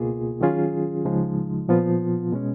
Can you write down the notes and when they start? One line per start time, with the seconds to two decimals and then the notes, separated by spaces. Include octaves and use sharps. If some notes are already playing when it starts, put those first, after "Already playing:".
Already playing: C#2 B2 A#3 F4 G#4
0.41 D#3 F#3 C#4 F4 G#4
1.05 C#2 C#3 F3 G#3 D#4
1.68 A#2 F3 B3 F4
2.32 B2 G#3 C#4